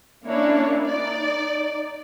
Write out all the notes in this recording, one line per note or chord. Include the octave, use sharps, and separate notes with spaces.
A#3 C#4 D4 E4 C#5
D#4 D5